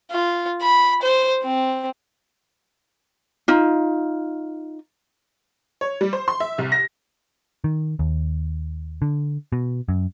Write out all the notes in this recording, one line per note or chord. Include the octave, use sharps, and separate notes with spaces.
F4
B5
C5
C4
D#4 F4
C#5
G3
C5
C6
E5
C2
A#6
D#3
D#2
D3
B2
F#2